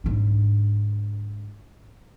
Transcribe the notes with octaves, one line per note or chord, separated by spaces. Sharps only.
G#2 D3